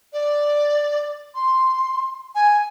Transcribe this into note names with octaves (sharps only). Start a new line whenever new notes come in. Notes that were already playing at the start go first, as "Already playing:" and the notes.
D5
C6
G#5